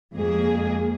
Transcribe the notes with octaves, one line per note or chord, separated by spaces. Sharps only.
F2 G#3 A#3 G#4